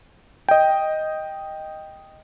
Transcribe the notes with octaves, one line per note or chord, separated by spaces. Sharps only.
D#5 G5